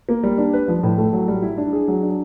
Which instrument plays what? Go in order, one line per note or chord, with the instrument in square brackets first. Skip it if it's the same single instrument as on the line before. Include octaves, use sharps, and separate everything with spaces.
[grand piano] A#3
G3
D4
B4
F3
A2
A3
F#3
G3
E4
D4
G#4
F#3
D4